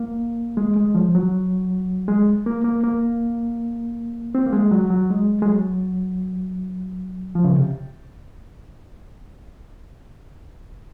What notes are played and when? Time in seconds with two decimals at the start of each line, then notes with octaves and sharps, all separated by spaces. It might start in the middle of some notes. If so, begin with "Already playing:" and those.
Already playing: A#3
0.57 G#3
0.76 G#3
0.95 F3
1.15 F#3
2.08 G#3
2.46 A#3
2.64 A#3
2.84 A#3
4.35 C4
4.46 A#3
4.53 G#3
4.71 F#3
4.90 F#3
5.10 G#3
5.42 G#3
5.48 F#3
7.35 F3
7.44 C#3
7.54 C3